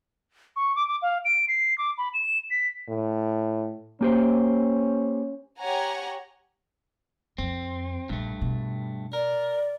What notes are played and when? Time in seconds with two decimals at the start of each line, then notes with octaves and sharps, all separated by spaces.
0.56 C#6
0.76 D6
0.88 D6
1.02 F5
1.25 D7
1.48 C7
1.78 D6
1.98 B5
2.14 E7
2.51 B6
2.88 A2
4.01 A#3 C#4 G4 C5
5.58 G4 C#5 F#5 G#5 A#5
7.38 F2 C4
8.09 A#1 G2 A3
8.41 B2
9.13 A#4 D5